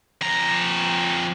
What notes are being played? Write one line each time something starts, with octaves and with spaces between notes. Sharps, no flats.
F2 A#5